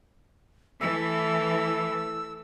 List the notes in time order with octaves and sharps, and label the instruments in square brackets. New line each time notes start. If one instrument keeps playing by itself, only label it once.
[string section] E3 [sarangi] A3 [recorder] E6